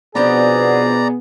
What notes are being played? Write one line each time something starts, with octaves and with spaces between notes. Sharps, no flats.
B2 F3 B3 C4 D4 G#4 D5 A#5